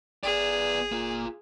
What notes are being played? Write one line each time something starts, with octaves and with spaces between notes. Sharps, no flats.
G1 B3 G#4 D5
A#3 F4